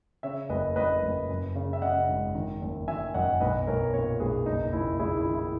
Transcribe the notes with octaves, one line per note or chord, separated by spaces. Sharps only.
C#3 C#5 E5
F#1 B4 D#5
F#1 B4 D#5
F#1
F#2
C#3
E5
C#3 D#5 F#5
G#1
D#3
F#1
D#3 E5 G#5
F#2 D#5 F#5
B1 B4 D#5
B1 A#4 C#5
A#2 A#4 C#5
B1 G#4 B4
F#1 D#4
F#1 E4
F#1 E4 G#4
E4
D#3
E4